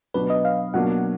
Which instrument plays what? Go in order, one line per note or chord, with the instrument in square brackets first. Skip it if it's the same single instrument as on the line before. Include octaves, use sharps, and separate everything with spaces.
[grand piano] B2 F#3 D4 [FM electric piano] B4
[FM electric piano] D#5
F5
[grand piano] B2 F#3 A#3 D4 [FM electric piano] F#5